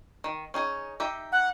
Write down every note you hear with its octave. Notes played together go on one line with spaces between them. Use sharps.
D#3
C#4 D#4 G#4
D#4 G4 E5
F#5